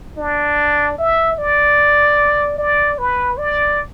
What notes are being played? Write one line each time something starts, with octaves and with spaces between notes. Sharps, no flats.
D4
E5
D5
D5
B4
D5